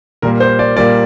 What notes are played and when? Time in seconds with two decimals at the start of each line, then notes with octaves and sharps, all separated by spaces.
0.22 A#2 G3 A#3 A#4
0.40 C5
0.59 D5
0.77 A#2 G3 A#3 D5